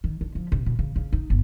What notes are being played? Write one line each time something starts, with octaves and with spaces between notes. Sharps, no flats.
D#3
D3
F3
C3
B2
C#3
C#3
D#4
G1